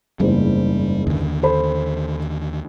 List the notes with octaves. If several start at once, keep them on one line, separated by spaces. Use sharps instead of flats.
F#1 E2 G#2 G3
D#2 D3
A4 C5 B5